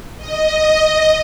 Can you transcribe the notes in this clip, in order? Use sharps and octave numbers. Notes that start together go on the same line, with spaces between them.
D#5